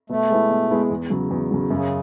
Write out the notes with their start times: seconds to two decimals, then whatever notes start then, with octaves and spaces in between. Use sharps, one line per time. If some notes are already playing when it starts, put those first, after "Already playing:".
0.09 B2 A3
0.30 G#3 B3 E4
0.50 B2
0.71 G#3 B3 E4
0.90 E2
1.10 C#3 F#3
1.30 E2
1.51 C#3 F#3
1.70 F#2 C#3